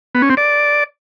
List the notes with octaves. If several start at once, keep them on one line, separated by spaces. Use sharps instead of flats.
B3
C#4
C4
D5